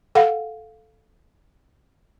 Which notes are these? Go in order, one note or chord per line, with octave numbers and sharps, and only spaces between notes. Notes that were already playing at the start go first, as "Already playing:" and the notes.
A4 F5 F#5